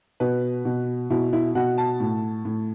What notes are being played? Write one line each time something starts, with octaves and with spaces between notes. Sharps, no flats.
B2 B4
B2
B2 E4
E4
B2 F#5
A5
A2
A2